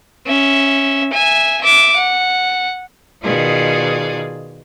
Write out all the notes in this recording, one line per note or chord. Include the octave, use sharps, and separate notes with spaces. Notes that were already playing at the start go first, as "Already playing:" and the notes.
C#4 E5
E5 G#5
E5 D6
F#5
B2 D#3 F4 G#4 D5 D#6